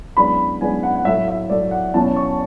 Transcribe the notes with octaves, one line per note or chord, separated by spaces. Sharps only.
F#2 E3 G#3 B3 D4 B5
F#2 E3 G#3 B3 D4 G#5
F#5
F#5
A2 F#3 A3 E5
E5
A2 F#3 A3 D5
F#5
E2 B2 F#3 C#4 E4 A5
C#6